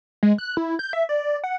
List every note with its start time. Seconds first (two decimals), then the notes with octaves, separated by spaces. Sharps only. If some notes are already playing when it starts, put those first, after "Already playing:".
0.23 G#3
0.38 F#6
0.57 E4
0.79 G6
0.93 E5
1.09 D5
1.44 F#5